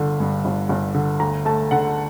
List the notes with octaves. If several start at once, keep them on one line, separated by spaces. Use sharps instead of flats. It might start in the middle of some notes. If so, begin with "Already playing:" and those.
Already playing: G1 D3
G2
G1
G1
D3
D2 A#5
A3 A5
D3 F#5